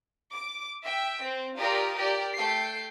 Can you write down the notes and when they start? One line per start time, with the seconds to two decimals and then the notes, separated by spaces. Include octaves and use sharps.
0.32 D6
0.84 E5 G5
1.22 C4
1.59 F4 G4 A#4 D5 A#5 D#6
1.97 G4 A#4 D5 G5
2.35 A3 A4 G5 C7